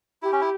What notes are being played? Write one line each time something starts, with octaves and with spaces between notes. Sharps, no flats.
E4 G4
C#4
E4